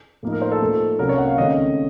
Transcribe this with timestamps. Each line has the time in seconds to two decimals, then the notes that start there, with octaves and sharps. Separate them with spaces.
0.23 A2 F3 A#3 D#4
0.32 A#4
0.42 C5
0.52 A4
0.60 A#2 A3 D#4
0.99 C2 C3 F#3 A#3 C#4 A#4
1.09 C#5
1.18 F#5
1.27 F5
1.38 C#2 C3 D#3 A3 C#4 D#5